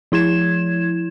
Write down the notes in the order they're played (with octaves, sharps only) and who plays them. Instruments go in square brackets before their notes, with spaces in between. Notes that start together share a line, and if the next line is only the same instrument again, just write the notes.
[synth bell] F3 E4 G#6 E7